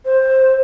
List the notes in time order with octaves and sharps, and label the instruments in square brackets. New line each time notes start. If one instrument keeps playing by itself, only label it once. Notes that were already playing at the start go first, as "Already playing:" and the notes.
[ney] C5